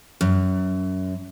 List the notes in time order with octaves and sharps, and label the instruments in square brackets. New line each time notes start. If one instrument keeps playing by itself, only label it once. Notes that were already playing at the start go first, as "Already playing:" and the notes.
[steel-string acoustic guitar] F#2